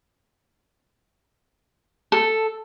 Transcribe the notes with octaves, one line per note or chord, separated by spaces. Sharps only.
A4